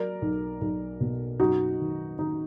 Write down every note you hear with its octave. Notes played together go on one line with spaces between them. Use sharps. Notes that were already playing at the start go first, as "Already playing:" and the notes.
Already playing: F#3 A#4 D5
B1
B1
B2
F#2 D#4 F#4
D#3
D#3 D#4